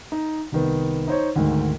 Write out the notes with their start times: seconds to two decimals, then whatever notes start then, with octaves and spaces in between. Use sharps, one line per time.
0.12 D#4
0.52 C2 D#3 B3
1.08 D#4 C5 C#5
1.36 D2 G#2 D#3